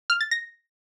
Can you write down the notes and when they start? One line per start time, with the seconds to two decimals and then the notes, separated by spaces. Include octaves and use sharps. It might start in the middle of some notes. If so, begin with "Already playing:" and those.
0.10 F6
0.21 A6
0.31 A#6